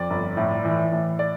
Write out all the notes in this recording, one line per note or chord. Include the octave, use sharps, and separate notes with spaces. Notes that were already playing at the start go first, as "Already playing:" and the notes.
Already playing: F2 D5
G1
A2
E3
A2
D5